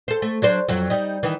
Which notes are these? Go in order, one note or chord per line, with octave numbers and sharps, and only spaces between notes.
A4 C5
A3
F#3 D4 C5
F2 F#3
G3 D#4
D#3 E3